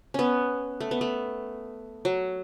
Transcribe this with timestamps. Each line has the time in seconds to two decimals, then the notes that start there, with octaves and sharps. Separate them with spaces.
0.14 B3 C#4
0.81 A3
0.91 B3
1.01 A3
2.05 F#3